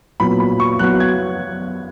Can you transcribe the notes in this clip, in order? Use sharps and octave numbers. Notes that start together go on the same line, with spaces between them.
A#2 F#3 B3 B5
B5
C#6
F#3 B3 F#4 F#6
G#6